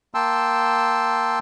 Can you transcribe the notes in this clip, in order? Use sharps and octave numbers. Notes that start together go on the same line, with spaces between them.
A#3 G5 A5 C6 E6